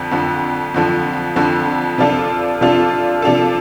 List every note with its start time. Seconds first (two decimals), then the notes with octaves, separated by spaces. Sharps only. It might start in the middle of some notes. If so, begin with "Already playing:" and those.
Already playing: F2 D3 F3
0.11 F2 D3 F3
0.74 F2 D3 F3
1.36 F2 D3 F3
1.98 C3 F3 D4 F4 A4
2.61 C3 F3 D4 F4 A4
3.22 C3 F3 D4 F4 A4